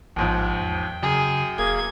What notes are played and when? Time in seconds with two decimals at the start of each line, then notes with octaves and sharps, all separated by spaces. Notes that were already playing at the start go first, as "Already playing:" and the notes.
0.16 A1 D#2 G#2 F3 G5
0.62 E2
1.03 F#2 C#3 G#4
1.58 E1 A#3 G#4 G#6